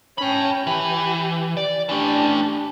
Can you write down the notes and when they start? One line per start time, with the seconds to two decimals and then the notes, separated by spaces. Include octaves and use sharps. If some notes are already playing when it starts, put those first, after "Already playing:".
0.18 C#4 G5 A5 B5
0.67 E3 G4
1.57 D5
1.89 E3 A3 D4 G4